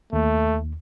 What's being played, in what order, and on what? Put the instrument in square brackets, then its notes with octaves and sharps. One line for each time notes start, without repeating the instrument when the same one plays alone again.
[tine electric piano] D#2 [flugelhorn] A3